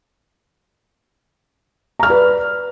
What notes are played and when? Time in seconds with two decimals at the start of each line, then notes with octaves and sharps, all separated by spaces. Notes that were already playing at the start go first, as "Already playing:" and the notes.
1.99 A#5
2.03 F6
2.06 D5
2.10 B4